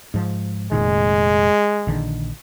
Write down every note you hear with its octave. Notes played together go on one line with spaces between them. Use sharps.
G#2 F3
F1 A#2 D#3 G#3
A#1 D3 D#3